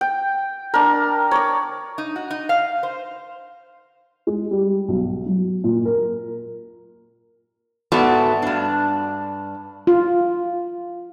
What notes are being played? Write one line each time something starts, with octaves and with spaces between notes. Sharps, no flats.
G5
D4 A#4
C#5 D5
D#4
F#4
D#4
F5
C5
G#3
G3
B1
F#3
A#2
A#4
G#2 A3 B3 F#4 D5
G2 D4
F4